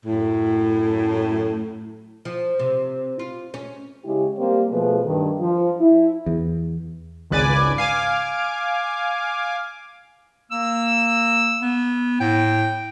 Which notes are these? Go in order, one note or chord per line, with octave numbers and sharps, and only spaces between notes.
F#2 A2
F3
C3
F4
C#4
C#3 G#3 E4 G4
G3 A#3 C4 G4 C5
B2 F3 A3 G#4 B4
G2 D#3
F3
E4
E2
G#1 C#2 B4 D5 G#5 D6
F5 G#5 D6
A#3 E6
B3
A2 G5